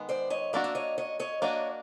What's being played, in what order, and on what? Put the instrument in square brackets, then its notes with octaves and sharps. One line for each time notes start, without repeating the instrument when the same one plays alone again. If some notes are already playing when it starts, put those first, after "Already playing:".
Already playing: [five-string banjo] D#3 G#3 B3
[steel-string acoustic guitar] C5 D5
C#5 D#5
[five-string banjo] A#3 D4 F#4 [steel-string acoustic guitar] D5 E5
[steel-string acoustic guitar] E5
C#5 D#5
C#5 D#5
C#5 D#5
[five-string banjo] A#3 D4 F#4 [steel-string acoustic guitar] C#5 D#5